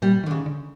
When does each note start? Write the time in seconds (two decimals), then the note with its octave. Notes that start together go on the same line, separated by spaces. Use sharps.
0.02 A#2 G3
0.24 D3 D#3
0.31 C#3
0.46 D3